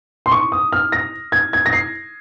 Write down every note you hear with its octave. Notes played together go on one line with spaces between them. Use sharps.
C6
C#6
D#6
F6
A#6
G#6
G#6
A#6
C7